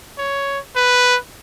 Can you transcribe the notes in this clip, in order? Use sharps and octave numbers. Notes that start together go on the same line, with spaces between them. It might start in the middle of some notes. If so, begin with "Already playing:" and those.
C#5
B4